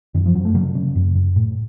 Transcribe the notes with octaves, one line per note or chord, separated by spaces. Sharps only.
F#2 D#3
F3
F#2 F#3
A3
C#3 F#3 A#3
C#3
F#2
F#2
A2